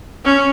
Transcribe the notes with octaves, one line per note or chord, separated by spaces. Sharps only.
C#4